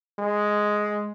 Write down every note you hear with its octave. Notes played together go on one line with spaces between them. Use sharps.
G#3